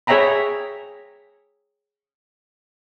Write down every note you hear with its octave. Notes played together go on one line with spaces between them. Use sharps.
G#4 C#5 E5 G5 A#5 B5